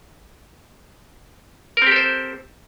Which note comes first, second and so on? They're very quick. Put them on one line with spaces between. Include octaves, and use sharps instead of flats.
A#4 C4 G4 A4 C5